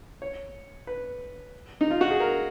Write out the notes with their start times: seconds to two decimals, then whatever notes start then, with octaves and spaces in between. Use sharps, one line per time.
0.22 C#5
0.87 B4
1.81 D#4
1.91 F4
2.01 F#4
2.11 G#4
2.20 A#4